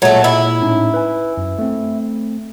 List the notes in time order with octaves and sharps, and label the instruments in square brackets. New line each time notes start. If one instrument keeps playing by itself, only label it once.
[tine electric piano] A#2 G#3 G#4 [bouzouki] F#3 A3
[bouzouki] E4
[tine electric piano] A2 C#4 D#4
B4 G#5
F#2
A3 C4